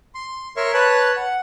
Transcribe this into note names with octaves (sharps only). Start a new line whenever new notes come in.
C6
A#4 C#5 E5 C6 C#6
B4 C#5 A5 F#6
F#5